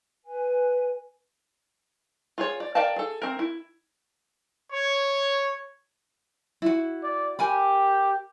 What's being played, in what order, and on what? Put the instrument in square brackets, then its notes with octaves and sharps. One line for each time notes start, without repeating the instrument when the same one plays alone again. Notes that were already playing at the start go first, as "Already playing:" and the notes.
[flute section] B4 G#5
[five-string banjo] F4 G#4 C#5
D5
A#4 D5 F5 G5 A5
G#4 A4
C4 A#4
E4
[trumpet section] C#5
[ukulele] E4 F#4
[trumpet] D5
[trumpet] G4 [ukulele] A#4 G#5 B5